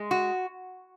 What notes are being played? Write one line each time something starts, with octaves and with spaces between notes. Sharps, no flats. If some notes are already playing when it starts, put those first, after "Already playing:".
Already playing: G#3
F#4